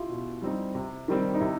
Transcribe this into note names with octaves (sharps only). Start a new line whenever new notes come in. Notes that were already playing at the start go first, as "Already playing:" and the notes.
Already playing: E4 F4 G4
B2
G3 C4 D#4
C3
D#3 G3 C4
D#4
C3 E4